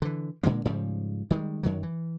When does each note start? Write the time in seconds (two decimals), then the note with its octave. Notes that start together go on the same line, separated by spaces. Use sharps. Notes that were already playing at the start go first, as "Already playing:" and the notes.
0.02 D3 E3
0.43 A#2 D3 G#3 A#3
0.65 G#2 C#3 F3 G3
1.30 D#3 G3 G#3
1.63 F#2 D#3 F#3
1.83 E3